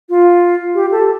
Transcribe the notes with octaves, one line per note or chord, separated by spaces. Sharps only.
F4
G4
A4